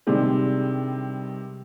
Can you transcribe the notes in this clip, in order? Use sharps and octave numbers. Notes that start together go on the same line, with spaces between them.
G2 C3 D#3 G#3